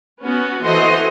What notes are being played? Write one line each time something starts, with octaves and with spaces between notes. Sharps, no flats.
B3 C#4 F#4
E3 F#4 A4 C5 D#5 C6